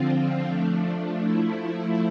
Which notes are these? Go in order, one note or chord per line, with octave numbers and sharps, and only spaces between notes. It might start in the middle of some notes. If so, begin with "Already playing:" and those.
Already playing: D3 F3 C4 F4
F3 A3 D4
F3 A3 E4